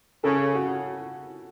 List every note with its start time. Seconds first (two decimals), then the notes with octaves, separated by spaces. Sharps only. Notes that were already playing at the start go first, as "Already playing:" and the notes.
0.24 C#3 A4
0.55 F#4